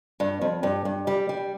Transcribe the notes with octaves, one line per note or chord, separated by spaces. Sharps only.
G2
F2
G2
G2
G3
G3